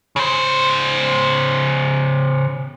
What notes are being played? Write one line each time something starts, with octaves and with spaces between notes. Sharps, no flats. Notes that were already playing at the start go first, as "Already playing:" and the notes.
C#3 C5